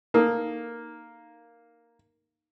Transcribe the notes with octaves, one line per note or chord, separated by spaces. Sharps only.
A#3 D#4 A4 A#4